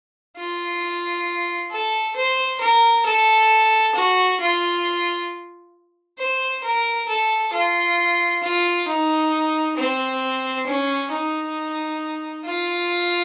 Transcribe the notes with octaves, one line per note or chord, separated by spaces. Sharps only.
F4
A4
C5
A#4
A4
F#4
F4
C5
A#4
A4
F4
F4
D#4
C4
C#4
D#4
F4